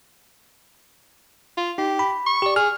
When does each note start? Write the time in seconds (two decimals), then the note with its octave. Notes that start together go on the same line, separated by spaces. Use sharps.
1.57 F4
1.78 D#4 G4
1.99 B5
2.27 C#6
2.42 G4 D5
2.56 G#4 F6